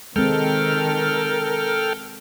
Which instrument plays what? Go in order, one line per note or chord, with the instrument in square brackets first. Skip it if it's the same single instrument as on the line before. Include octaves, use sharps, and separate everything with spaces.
[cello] D#3 [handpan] G#3 C4 [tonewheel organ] A4 G5 F6 [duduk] A#4